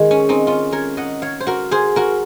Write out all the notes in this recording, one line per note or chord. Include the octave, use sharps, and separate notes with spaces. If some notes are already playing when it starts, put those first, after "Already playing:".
Already playing: D#3 G#3
C#4
C4 D#4
C#4 F4
A#4 C#5
D#5 F#5
C#5 F5
C5
F#4 A#4
G#4 C5
F#4 A#4